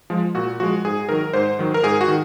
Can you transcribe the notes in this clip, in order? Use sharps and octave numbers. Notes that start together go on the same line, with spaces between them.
F3 G#3
A#2 F#4
F3 G#3 F#4
G#2 G#4
D#3 F#3 A#4
G#2 C5
D#3 F#3
A#4
G#2 G#4
F#4
D#3